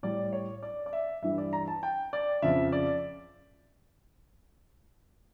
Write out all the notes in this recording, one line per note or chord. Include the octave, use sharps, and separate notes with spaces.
A2 G3 D5
C#5
D5
D5
E5
G2 E3 G3 E5
D5
A#5
A5
G5
D5
F2 C#3 F3 E5
D5